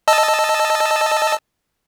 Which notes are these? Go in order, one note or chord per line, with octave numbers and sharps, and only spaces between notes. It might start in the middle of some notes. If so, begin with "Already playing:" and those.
D#5 A5 E6